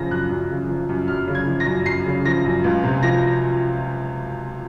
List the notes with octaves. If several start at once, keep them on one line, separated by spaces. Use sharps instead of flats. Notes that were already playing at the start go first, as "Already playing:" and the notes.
Already playing: F#2 C#3 F3 A#6
F#2 F#6
F#2
C#3
F3
F#2
F#2 F6
C#3
G#6
F3
A#6
F#2
F#2 C7
C#3
F3 A#6
F#2
C#2
C3
F3 A#6